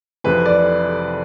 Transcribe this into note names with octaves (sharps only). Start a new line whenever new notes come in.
F1 F2 C3 E3 B4
D5